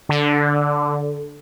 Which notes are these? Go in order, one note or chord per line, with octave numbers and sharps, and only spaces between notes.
D3